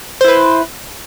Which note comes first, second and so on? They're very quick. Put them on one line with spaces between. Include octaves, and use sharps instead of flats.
C5 E4 B4